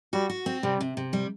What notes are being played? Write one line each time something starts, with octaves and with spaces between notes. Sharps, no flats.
G3 F#4
F#4
C4
C3 G3
C3
C3
G3